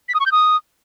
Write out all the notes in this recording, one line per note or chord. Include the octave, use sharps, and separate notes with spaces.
B6
D#6
C#6
G6
D#6